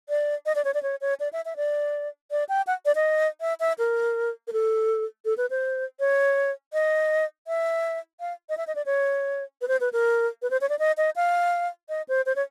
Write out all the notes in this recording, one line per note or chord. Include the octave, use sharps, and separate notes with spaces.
D5
D#5
D5
C#5
D5
C#5
C#5
D5
E5
E5
D5
D5
G5
F#5
D5
D#5
E5
E5
A#4
A#4
A4
A4
B4
C5
C#5
D#5
E5
F5
D#5
E5
D#5
D5
C#5
B4
C5
B4
A#4
B4
C5
C#5
D5
D#5
D#5
F5
D#5
C5
C5
C#5